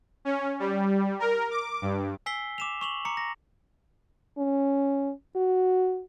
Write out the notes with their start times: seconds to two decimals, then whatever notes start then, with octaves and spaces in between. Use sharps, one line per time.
0.25 C#4
0.60 G3
1.20 A#4
1.51 D6
1.82 G2
2.26 G#5 E6 B6 C7 G7
2.58 D6 E7 F7
2.81 C#6 F7 F#7
3.05 A#5 D6 C#7
3.17 A#6
4.38 C#4
5.36 F#4